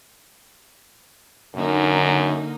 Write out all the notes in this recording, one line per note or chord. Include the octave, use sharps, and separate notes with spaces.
F#2 D3 A#3 D#4